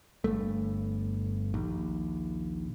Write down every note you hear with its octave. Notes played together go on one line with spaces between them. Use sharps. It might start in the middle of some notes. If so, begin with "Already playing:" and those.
G1 G2 A3
A#1 D#2